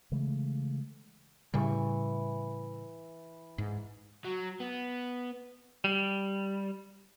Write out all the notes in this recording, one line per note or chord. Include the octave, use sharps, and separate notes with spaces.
C#3 E3 G#3 A3
A2 C#3 E3 G3 C#6
G#2
F#3
B3
G3